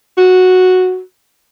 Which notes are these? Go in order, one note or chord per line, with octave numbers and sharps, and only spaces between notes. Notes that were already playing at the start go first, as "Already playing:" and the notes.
F#4